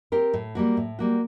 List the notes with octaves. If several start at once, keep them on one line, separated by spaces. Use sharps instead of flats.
C4 G4 A#4
A2
G3 A#3 F#4
A2
G3 A#3 F#4